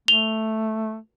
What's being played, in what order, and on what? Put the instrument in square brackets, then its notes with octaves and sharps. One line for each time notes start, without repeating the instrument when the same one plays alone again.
[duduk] A3 [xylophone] F7 G7